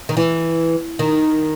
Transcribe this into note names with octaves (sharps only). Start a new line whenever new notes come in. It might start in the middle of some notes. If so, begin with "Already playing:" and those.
D#3
E3
D#3